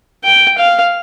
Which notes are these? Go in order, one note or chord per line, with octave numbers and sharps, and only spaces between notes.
G5
F5